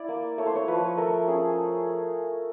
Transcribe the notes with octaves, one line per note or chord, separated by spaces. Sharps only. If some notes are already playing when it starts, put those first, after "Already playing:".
Already playing: E4 D5
A#3
A3 C#5
C5
C#5
F3 B4
A3 A#4
C#4 G#4